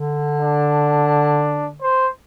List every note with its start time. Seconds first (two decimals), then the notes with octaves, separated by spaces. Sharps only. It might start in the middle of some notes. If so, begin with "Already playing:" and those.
Already playing: D3
0.41 D4
1.82 C5